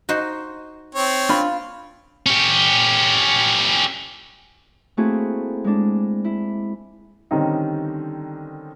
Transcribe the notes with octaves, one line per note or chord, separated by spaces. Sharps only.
D#4 F#4 C5
C4 C#5
D4 F4 B5
C#4 G4
A3 A#3 C4 E4 F#4 G#4
G#3 D4
E4
D3 D#3 G3 C4 C#4 D#4